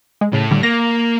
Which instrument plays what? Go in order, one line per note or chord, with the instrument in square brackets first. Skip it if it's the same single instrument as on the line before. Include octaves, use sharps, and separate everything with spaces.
[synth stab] G#3
[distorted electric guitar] A2 [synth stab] C#3
[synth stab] D3 G3
[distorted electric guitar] A#3 [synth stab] A#6